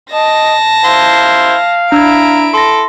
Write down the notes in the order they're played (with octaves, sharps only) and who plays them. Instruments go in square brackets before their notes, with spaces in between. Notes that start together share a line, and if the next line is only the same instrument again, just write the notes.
[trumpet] D#5 [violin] A5 A#6
[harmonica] E4 C5 C6 [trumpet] F5
[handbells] D4 E6 G#6 [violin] E4 D7 [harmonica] A#5
[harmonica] A4 [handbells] C6 A#6